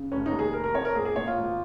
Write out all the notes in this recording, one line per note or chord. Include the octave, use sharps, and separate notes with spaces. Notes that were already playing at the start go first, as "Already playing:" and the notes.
Already playing: C#3
F1 C#4
D#4
D#2
G#4
F1 A#4
A#4
F2 C#5
A#4
A#1 G#4
G#4
A#2 C#5
F4
G#1